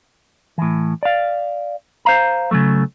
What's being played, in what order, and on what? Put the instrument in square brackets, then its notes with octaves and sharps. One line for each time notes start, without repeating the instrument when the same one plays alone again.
[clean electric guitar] A2 E3
D5 F5
C5 F5 A#5
C#3 E3 F#3 A3